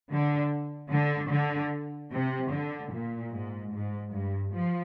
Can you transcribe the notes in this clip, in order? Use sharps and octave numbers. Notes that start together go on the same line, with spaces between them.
D3
D3
D3
C3
D3
A#2
G#2
G#2
G2
F3